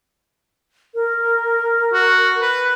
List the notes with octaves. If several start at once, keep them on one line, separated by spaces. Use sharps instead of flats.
A#4
F#4
B4